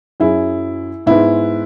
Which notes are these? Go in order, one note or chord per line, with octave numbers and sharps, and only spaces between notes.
F#2 F#3 C#4 E4 G#4
G#2 G#3 B3 E4